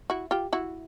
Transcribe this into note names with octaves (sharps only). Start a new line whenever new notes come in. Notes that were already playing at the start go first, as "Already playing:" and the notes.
E4 F#4
F4 G4
E4 F#4